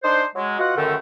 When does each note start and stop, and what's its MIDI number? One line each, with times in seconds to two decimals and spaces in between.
0.03 0.24 62
0.03 0.24 63
0.03 0.24 72
0.35 0.55 54
0.35 0.55 56
0.59 0.74 47
0.59 0.74 65
0.59 0.74 66
0.59 0.74 75
0.59 0.74 78
0.76 0.95 37
0.76 0.95 42
0.76 0.95 50
0.76 0.95 51
0.76 0.95 57